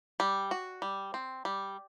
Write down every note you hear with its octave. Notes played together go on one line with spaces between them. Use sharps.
G3
F#4
G3
C4
G3